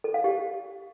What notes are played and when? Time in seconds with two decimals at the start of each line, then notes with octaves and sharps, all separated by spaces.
0.04 A4
0.14 F5
0.24 G4